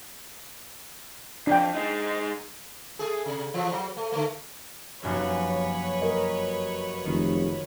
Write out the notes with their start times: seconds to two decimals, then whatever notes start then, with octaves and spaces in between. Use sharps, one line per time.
1.47 F2 D4 G5
1.75 G#3 D#4
2.99 A3 G#4
3.25 C3
3.54 E3 F3
3.72 F#3
3.97 A3
4.12 D3 A3
5.03 F1 F#2 A#3 B4 C#5
6.02 A#4 D#5
7.06 F1 D#3